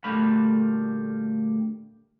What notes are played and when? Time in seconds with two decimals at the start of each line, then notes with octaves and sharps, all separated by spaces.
0.04 D2 A#2 G3 A3 F5 B5